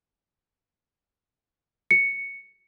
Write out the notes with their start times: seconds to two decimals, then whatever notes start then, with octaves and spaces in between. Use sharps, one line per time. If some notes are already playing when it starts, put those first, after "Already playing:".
1.91 C#7